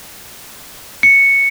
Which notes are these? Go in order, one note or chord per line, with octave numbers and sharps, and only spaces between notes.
C#7